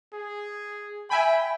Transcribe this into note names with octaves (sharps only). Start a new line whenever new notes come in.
G#4
E5 G5 G#5 B5